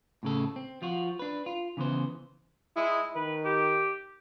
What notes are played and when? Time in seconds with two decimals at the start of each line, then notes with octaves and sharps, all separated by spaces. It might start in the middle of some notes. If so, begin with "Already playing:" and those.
0.23 A2 C#3 A4
0.56 C4
0.82 F3 F4 F#4
1.19 D4 B4
1.46 F4
1.77 C#3 E3 B3 C5
2.76 G#3 E4
3.15 D#3 B4
3.45 G4